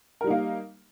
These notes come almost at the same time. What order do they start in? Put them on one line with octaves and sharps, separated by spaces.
A#4 G3 D#4 A#3